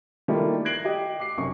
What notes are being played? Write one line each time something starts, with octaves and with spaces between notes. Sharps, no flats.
D#3 G3 A3 A#3 E4 F4
F#6 G#6 A#6 C7 D7 F#7
G4 D#5
D6 C7
F1 F#2 C#6